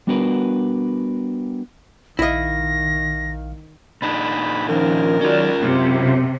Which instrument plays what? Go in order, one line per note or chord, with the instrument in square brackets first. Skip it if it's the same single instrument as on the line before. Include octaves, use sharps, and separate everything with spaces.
[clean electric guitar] G3 B3 D4 F#4 A#4 B4
[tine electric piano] A#1 F5 [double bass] D#3 [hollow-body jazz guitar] E4 D#5 [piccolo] A#6
[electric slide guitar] A#2 D4 D#4 [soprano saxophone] B5
[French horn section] D#3 F3 C#4 [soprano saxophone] A#4
[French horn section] D#3 F#3 D5 [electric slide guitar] C#4 F4
[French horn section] F#2 [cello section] C3